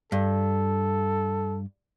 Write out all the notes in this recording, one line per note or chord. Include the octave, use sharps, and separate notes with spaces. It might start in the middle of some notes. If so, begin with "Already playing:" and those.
G2 A4